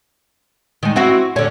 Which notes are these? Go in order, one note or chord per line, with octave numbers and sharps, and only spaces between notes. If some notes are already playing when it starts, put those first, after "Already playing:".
D#3 G#3
C4 E4 F#4
D3 C#4